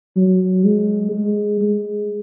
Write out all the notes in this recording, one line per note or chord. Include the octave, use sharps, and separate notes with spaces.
F#3
G#3
G#3
G#3